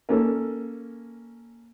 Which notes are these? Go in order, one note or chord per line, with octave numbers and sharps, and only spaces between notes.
A#3 C#4 A4